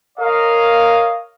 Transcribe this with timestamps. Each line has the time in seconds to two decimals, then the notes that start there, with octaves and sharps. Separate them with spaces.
0.18 A#4 C#5 D#5 F5